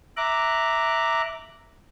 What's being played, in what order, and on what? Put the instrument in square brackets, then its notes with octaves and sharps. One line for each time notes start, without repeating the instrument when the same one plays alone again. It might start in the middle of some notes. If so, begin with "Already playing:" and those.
[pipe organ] E5 A#5 D6 F#6